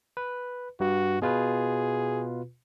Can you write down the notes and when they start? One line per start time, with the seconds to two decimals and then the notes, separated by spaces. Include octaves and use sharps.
0.17 B4
0.80 G2 F#4
1.22 B2 F4 G#4 B4